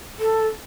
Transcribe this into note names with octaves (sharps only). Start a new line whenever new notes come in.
A4